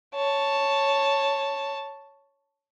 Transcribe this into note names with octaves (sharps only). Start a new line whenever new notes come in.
C#5 A5